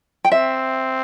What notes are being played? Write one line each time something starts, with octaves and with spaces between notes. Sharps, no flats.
G5
C4 E5